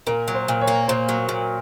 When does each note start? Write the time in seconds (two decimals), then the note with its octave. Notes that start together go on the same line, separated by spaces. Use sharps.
0.07 A#2 A#4
0.28 F#3
0.34 C5
0.48 A#2
0.61 C#5
0.68 A#3
0.88 A#2 C5
1.09 F#3
1.29 A#2